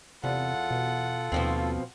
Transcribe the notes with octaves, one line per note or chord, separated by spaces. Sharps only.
E2 C3 F4 A4 F#5
B2
D#2 B2 F3 C4